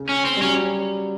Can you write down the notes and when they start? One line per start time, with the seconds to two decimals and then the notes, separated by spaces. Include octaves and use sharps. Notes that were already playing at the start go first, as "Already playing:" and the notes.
Already playing: C#3
0.09 C#4
0.25 C4
0.37 G3
0.42 F#3 C#4